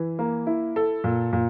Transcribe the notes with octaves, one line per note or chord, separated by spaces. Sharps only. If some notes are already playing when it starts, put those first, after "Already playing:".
Already playing: E3
A#3
E4
A4
A#2
A#2